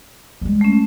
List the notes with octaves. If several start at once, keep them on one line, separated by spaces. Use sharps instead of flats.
G3 G#3
A3 C#4